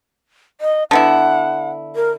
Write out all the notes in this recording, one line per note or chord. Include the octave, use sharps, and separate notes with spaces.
D#5
D3 B3 E4 F#5
A#4